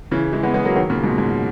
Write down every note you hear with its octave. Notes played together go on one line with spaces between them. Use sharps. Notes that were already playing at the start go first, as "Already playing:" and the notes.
C#3 E3
E3 G#3
G#3 B3
G#3 B3
F#3 A#3
D#3 F#3
A#2 C#3
G#2 B2
G#2